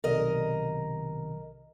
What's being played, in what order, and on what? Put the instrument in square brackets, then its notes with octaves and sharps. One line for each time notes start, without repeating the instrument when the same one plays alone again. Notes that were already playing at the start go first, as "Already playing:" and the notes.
[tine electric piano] B1 C3 D#3 [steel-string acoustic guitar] A#4 D#5